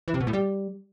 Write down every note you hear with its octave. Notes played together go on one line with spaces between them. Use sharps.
E3
C3
B2
A2
G3